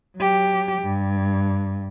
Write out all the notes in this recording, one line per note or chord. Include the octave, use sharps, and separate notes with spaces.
F#3 G4
G2